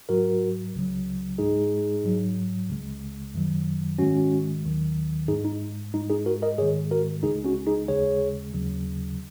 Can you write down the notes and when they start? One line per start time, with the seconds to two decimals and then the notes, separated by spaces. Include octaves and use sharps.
0.09 G#2 F#3 F#4 A#4
0.74 C#2 C#3 F#3
1.38 G#2 G#3 D#4 G#4
2.04 G#2 F#3
2.69 C#2 C#3 G#3
3.34 F#2 D#3 F#3
3.99 G#2 D#3 G#3 C#4 F#4
4.64 D#2 D#3 F#3
5.28 G#2 D#4 G#4
5.33 G#3
5.45 D#4
5.94 G#2 G#3 D#4
6.10 D#4 G#4
6.26 F#4 A#4
6.42 A#4 D#5
6.58 G#2 D#3 G#3 G#4 C#5
6.91 F#4 A#4
7.23 C#2 C#3 G#3 D#4 G#4
7.44 C#4 F#4
7.67 D#4 G#4
7.88 D#2 C#3 G#3 G#4 C#5
8.54 D#2 C#3 F#3